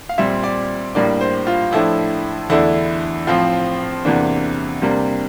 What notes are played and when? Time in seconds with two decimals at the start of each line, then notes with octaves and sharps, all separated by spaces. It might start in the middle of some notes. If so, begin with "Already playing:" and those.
0.09 F5
0.18 A#2 G3 C4 E5
0.44 D5
0.95 A2 G3 A#3 D4 D5
1.21 C5
1.47 F4
1.72 A2 F3 A3 D4 E4
2.49 E2 D3 A3 D4 E4
3.27 A2 F3 C4 F4
4.05 E2 C3 E3 A#3 D4
4.82 C3 G3 A#3 D4